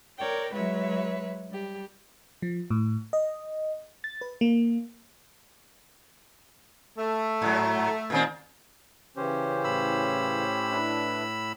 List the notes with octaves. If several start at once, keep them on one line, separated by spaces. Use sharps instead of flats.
A#4 C#5 D5 G5
F#3 G#3 B4 C#5 E5
G3 G4
F3
A2
D#5
A6
B4
A#3
A3
G#2 F#3
A#2 D#3 C4
C#3 E3 C#4 G4 C5
A2 B5 E6
D4 E4 B4